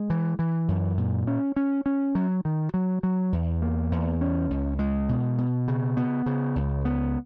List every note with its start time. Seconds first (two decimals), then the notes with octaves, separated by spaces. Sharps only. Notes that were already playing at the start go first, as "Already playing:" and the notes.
Already playing: G#3
0.10 E3
0.39 E3
0.68 F#2
0.97 A#2
1.27 C#4
1.56 C#4
1.86 C#4
2.15 F#3
2.45 D#3
2.74 F#3
3.03 F#3
3.33 E2
3.62 A#3
3.92 E2
4.21 C#4
4.51 C#2
4.79 G#3
5.09 B2
5.38 B2
5.68 C#3
5.97 B3
6.26 C#3
6.56 C#2
6.85 B3